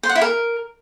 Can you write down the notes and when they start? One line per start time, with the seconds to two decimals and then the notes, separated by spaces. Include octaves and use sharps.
0.03 C5
0.09 F#5
0.15 E4
0.21 A#4